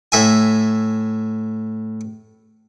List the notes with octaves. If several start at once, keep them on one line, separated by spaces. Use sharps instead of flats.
A2 E5 G#5